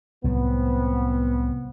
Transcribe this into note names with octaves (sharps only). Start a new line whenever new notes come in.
C2 A2 F#3 B3 C4